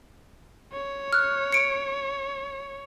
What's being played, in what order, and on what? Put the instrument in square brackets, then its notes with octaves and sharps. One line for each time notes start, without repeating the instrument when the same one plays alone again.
[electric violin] C#5
[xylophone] F6 F#6
C#7 D7